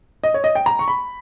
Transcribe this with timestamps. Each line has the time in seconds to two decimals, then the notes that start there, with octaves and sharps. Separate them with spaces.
0.24 D#5
0.34 C#5
0.44 D#5
0.55 G5
0.66 A#5
0.79 C#6
0.88 B5